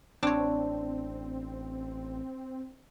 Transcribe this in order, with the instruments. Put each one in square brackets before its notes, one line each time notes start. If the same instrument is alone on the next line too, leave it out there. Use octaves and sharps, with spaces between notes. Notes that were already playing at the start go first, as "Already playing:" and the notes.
[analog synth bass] A1 [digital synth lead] C4 [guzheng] D4 C#5